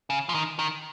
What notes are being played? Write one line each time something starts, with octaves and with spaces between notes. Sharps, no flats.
C#3
F3
D#3
D#3